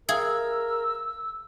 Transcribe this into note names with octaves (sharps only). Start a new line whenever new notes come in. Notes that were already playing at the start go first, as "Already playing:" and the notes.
G#4 A#4 E5 F5 E6 G#6